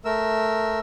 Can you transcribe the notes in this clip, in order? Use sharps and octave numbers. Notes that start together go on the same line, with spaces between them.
A3 A#4 E6